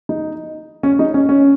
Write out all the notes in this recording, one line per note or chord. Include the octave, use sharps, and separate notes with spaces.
D#4
C#4
D#4
C#4
C#4